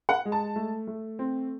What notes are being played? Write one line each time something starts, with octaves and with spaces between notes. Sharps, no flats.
F#5
G#3
A5
A3
A3
C4